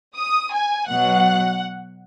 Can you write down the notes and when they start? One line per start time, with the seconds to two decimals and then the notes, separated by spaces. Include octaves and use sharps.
0.16 D#6
0.52 G#5
0.87 B2 F#3 F#5